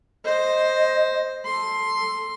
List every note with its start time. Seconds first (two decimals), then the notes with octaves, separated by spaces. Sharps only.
0.25 C5 D#5
1.45 A4 C6